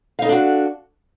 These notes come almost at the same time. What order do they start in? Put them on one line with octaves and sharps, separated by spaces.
F5 D#4 A4 D4 F#4